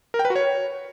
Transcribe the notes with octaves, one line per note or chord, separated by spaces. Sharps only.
A#4
G5
B4
F#4
C#5